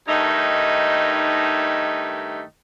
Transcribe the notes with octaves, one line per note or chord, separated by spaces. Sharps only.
G2 D#3 A3 D#4